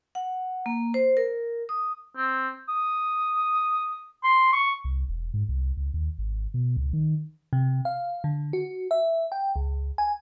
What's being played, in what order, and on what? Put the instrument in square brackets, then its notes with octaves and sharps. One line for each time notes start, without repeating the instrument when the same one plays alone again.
[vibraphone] F#5
A#3
C5
A#4
D#6
[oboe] C4
D#6
C6
C#6
[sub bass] C2
E1
G#2
C2
C#2
D#2
G#1
B2
C#2
D#3
[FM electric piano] C3
F5
D3
F#4
E5
G5
C#2
G#5